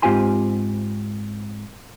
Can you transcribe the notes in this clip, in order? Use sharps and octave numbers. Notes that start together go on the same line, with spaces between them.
G#2 C4 F4 G4 G#5 C6